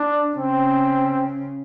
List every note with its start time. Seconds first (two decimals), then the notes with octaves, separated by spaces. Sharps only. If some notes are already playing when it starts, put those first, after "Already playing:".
Already playing: D4
0.37 C#3 C4